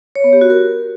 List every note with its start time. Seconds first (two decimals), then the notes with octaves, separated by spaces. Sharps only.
0.16 C#5
0.24 B3
0.33 G4
0.41 F#4
0.50 A#4